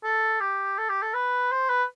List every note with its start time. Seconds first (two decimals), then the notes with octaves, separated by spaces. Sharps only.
0.04 A4
0.41 G4
0.78 A4
0.89 G4
1.02 A4
1.14 B4
1.52 C5
1.69 B4